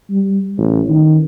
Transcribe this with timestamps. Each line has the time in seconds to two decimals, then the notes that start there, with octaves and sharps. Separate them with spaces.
0.10 G3
0.57 A1
0.89 D#3